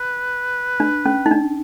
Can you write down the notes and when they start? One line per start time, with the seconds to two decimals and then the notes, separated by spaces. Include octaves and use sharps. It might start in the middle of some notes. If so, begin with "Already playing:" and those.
Already playing: B4
0.80 D4
1.06 C#4
1.26 D#4
1.31 D4